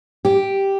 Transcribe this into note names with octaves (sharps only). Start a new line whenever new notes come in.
G4